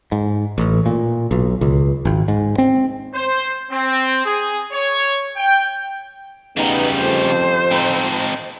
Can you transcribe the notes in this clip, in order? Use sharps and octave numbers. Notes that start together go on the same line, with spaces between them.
G#2
A1
A#2
B1
C#2
G#1
G#2
C4
C5
C4
G#4
C#5
G5
C#3 G3 B3 D#4
F2 C5
C4 D#4